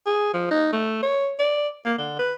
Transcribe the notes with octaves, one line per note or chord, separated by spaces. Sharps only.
G#4
F3
D#4
A3
C#5
D5
A#3
D3
B4